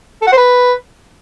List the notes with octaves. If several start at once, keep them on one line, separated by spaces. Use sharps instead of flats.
A4
F#5
C5
B4